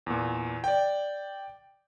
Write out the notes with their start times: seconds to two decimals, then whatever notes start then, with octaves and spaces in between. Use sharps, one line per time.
0.06 E2 A#2
0.64 D5 G5